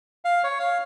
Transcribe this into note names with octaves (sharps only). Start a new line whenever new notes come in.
F5
C#5
F5